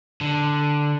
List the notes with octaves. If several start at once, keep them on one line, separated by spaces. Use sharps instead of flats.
D3